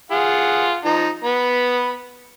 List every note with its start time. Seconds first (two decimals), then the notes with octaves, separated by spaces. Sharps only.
0.11 F4 G#4 F#5
0.85 F3 D#4
1.24 B3 B5